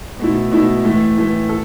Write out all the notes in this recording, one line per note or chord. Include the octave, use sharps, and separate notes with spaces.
B2 A3 E4
B2 A3 E4
A2 E3 A3
A2 E3 A3
A4